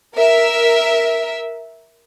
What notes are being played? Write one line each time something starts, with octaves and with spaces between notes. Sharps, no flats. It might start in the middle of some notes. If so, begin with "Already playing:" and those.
A#4 E5